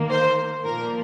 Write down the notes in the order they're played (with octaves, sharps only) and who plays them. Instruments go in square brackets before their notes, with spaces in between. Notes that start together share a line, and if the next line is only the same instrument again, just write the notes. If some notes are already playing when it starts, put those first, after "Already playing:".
Already playing: [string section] D#3 A#3
C5
A#2 F3 A#3 A#4